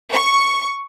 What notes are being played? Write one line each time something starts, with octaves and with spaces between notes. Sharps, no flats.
C#6